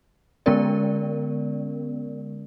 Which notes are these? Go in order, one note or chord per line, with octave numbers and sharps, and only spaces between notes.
D3 G#3 B3 C#4 A#4 D5